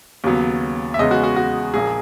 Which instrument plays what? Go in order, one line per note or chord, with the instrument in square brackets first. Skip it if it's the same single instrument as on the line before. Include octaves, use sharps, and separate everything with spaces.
[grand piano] D#2 C#3 F#3 B3
E5
E2 C#3 G#3 B3 D#5
F#4
F#4
F#4
A#1 A#2 A#3 G#4